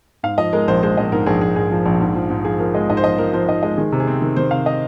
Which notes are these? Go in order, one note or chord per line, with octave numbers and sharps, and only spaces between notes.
G#2 F5
F3 D#5
G#3 A#4
A#1 C5
G#3 C5
A#1 D#5
G#2 A#4
A#1 G#4
A#1 G#4
G#2 G#4
F3
A#1
G#2
F3
G#2
F3 G#4
F3 A#4
G#3 D#5
G#2 D#5
C5
F3 D#5
F3 A#4
F3 C5
G#2 D#5
G#3 D#5
D#3 G#4
C3
G#4
C4
D#3
D#3 C5
C3 F5
D#5